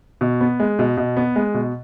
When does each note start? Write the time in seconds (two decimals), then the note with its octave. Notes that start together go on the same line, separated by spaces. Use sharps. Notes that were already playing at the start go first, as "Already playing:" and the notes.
0.21 B2
0.41 B3
0.60 G#3
0.79 B2
0.97 B2
1.17 B3
1.36 G#3
1.54 B2